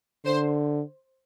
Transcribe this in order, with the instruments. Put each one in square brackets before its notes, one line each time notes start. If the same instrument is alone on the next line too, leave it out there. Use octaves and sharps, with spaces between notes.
[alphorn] D3 [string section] C5